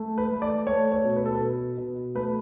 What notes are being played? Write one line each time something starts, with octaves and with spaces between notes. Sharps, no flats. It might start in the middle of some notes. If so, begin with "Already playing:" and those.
Already playing: A3
B4
A3
D5
A3 C#5
C#5
B2
B4
A4
B4
B2
B2
A3 B4